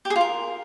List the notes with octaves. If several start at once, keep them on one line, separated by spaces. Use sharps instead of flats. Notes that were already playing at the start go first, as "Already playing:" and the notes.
G4
G#4
F4
A#4